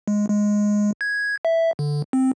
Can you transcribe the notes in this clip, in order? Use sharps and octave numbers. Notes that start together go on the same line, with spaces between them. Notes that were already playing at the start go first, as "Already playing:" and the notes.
G#3
G#3
G#6
E5
D3
C4